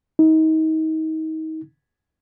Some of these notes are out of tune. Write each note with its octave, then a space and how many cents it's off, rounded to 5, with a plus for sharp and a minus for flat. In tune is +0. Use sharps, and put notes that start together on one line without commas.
D#4 +30